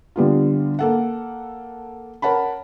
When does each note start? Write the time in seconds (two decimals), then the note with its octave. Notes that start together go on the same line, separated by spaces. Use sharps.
0.16 D3 G3 B3 F4
0.79 A#3 A4 F#5
2.22 A#4 C#5 F#5 A5 B5